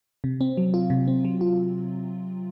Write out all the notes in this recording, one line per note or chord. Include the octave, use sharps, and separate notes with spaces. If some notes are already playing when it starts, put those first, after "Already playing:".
C3
C4
F#3
F4
C3
C4
F#3
F4